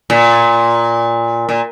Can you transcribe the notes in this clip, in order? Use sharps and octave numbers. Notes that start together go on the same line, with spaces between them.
A#2
A#2